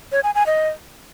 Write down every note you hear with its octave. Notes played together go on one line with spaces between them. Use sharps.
C#5
G#5
G#5
D#5